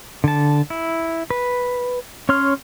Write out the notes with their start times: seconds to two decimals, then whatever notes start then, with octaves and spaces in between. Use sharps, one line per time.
0.24 D3 A5
0.70 E4
1.30 B4
2.29 C#4 C#5 C6 F6